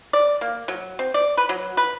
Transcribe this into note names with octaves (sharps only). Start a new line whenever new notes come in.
D5
A#3
F#3
C4
D5
B4
F#3
B4